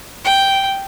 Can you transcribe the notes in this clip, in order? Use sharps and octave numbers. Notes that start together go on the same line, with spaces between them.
G5